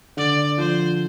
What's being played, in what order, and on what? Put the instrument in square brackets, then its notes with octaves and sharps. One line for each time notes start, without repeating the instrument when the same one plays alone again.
[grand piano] D3 [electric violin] D5
[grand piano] F3 [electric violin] C5